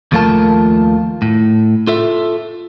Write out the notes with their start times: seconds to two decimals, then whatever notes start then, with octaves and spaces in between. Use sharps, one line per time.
0.12 D#2 F3 A3 F4 A#4 A5
1.22 A2
1.87 F4 A4 E5